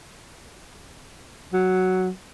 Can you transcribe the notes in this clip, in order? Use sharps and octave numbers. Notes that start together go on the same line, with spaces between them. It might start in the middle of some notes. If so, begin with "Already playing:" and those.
F#3